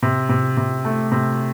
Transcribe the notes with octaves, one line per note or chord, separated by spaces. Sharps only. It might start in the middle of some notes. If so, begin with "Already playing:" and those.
C3
C3
C3
A3
C3